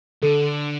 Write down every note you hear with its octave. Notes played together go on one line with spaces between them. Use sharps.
D3 A4